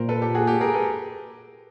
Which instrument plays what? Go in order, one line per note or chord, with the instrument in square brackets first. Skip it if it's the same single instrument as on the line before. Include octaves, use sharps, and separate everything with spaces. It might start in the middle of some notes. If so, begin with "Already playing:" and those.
Already playing: [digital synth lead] A#2 [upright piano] A#4 C5
[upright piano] A4 B4
G4 A4
F#4 G#4
G4 A4
G#4 A#4
A4 B4